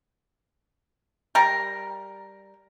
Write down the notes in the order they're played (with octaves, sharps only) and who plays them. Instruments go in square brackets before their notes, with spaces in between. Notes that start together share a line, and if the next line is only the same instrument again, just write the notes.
[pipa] G3 A#4